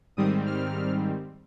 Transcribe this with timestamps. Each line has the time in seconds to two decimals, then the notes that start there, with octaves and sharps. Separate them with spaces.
0.17 G#2 D#3 G3 C4 D#6
0.46 F6